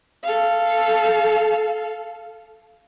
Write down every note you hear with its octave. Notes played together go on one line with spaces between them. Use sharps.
A4 F5